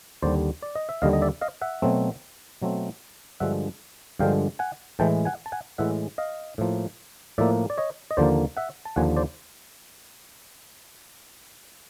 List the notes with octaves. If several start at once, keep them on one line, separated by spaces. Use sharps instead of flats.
D#2 D3 G3 C5 D5
D5
D#5
E5
D#2 D3 G3 D#5 F5
D#5
D5 E5
D#5 F5
E5 F#5
B2 F#3 A3 C4
B2 F#3 A3 C4
G2 D3 F3 G#3 E5 F#5
G2 D3 F3 G#3 F5 G5
F#5 G#5
A2 E3 G#3 G5 A5
F#5 G#5
A5
F#5 G#5
A2 E3 G#3 E5 F#5
D#5 F5
A2 F3 A#3
A2 F3 A#3 D5 E5
D5
C#5 D#5
D#5
D#2 D3 F3 A#3 C5 D5
E5 F#5
A5
D#2 D3 F3 A#3 F#5 G#5
C5 D5